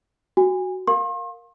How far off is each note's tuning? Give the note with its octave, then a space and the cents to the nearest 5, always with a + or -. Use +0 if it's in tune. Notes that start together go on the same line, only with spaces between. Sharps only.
F#4 +0 G#5 -30
A#4 +0 F5 +20 C6 +45